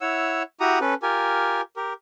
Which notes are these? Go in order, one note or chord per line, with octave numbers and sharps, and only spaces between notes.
E4 C#5 F#5 E6
E4 F#4 G4 F#5 A#5 D#6
C#4 A4 B4
F4 G4 A#4 G#5
G4 A#4